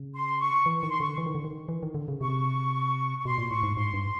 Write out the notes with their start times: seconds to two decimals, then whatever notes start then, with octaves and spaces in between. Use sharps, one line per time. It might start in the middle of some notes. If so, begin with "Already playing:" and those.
Already playing: C#3
0.14 C6
0.39 C#6
0.66 E3
0.78 C#6
0.83 D#3
0.89 C6
1.00 D3 C#6
1.18 E3
1.26 D#3
1.35 D3
1.44 D#3
1.69 E3
1.83 D#3
1.94 D3
2.08 C#3
2.20 C3 C#6
3.18 C#6
3.24 B2 C6
3.38 A#2
3.50 A2 C#6
3.63 G#2
3.77 G#2 C6
3.93 G2